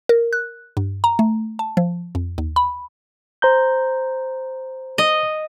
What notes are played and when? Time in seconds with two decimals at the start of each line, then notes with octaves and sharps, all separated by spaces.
0.09 A#4
0.33 F#6
0.77 G2
1.04 A#5
1.19 A3
1.59 A5
1.77 F3
2.15 F2
2.38 D#2
2.56 B5
3.42 C5 A#5 G6
4.98 D#5